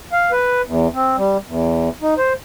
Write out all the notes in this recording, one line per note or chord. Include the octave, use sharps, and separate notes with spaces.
F5
B4
E2
C4
G3
E2
D#4
C5